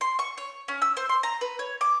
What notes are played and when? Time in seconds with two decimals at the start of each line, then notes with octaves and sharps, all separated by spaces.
0.01 C6
0.19 C#6
0.38 C#5
0.68 C#4
0.82 E6
0.97 C5
1.09 C6
1.23 A#5
1.41 B4
1.59 C#5
1.81 D6